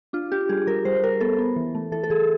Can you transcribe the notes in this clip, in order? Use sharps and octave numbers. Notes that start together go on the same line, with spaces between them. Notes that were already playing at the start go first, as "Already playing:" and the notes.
D4 F4
D4 G4
G3 G#4
G3 A#4
G3 C5
G3 A#4
B3 A4
B3
E3
A3
E3 A4
A4
E3 G#4